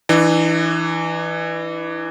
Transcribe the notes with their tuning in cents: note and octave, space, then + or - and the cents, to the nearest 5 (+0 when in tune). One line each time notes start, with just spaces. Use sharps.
E3 +0 D4 +45